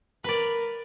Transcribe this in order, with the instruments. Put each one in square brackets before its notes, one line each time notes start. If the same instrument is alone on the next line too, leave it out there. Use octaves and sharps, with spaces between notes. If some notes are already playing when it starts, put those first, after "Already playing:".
[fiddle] A#4 [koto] B4 D5